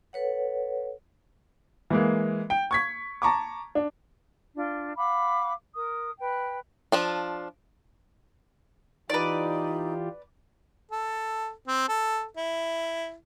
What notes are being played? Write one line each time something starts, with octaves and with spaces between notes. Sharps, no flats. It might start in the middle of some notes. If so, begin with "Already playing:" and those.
A4 B4 C#5 F#5
E3 G#3 A#3
G5
C#6 G#6 B6
A5 A#5 C#6 D6
D4
D4 F4
F5 F#5 B5 D6
A#4 D#6
B4 G5
F3 D4 F4
E3 D#4 F4 G4 B4 D5
A4
C4
A4
E4